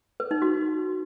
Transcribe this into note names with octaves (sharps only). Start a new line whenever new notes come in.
B4
D#4
F#4